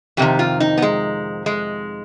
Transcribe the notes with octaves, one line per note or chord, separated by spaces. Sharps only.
F2 C3 D#3 G4
F4
D#4
B3
G#3
G#3